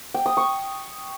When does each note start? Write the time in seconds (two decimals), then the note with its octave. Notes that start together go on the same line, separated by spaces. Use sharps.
0.14 G5
0.26 D#6
0.37 C#6